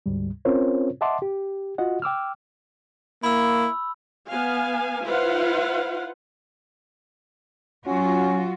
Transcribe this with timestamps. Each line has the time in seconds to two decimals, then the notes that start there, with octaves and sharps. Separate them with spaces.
0.06 D2 G#2 G3
0.45 C4 C#4 F4 A#4 C5 C#5
1.01 D#5 E5 F#5 A5 C6 D6
1.22 G4
1.78 F4 F#4 D#5 F#5
2.02 G5 D6 E6 F6
3.23 A#3 E4 B5 E6
4.29 B3 F5 G#5
5.04 E4 F4 B4 C5 F5 F#5
7.87 F#3 C#4 F4 F#4